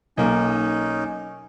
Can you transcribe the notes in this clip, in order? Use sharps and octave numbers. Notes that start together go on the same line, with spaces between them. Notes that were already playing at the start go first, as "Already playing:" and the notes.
B1 A#3 C#4 D#4